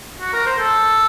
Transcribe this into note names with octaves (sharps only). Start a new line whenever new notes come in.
F#4
A#4
C5
A4